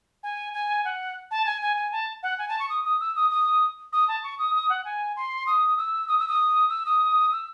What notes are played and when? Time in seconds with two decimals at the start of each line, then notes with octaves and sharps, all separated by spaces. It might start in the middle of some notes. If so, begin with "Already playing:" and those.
0.23 G#5
0.53 G#5
0.85 F#5
1.31 A5
1.46 G#5
1.62 G#5
1.76 G#5
1.92 A5
2.23 F#5
2.38 G#5
2.49 A5
2.59 C#6
2.69 D#6
2.85 D#6
3.00 E6
3.15 D#6
3.30 D#6
3.92 D#6
4.08 A5
4.23 C#6
4.38 D#6
4.54 D#6
4.69 F#5
4.85 G#5
5.16 C6
5.47 D#6
5.78 E6
6.08 D#6
6.19 E6
6.28 D#6
6.69 E6
6.85 D#6
7.32 E6